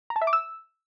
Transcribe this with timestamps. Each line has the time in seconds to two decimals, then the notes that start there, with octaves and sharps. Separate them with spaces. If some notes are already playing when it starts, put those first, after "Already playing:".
0.10 A#5
0.16 A5
0.22 E5
0.27 D6
0.33 E6